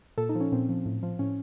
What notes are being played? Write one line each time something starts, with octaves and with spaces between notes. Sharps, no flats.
A#2 A4
D#4
F3
C#4
A#2 C4
F3
A2
F3
A2 C#4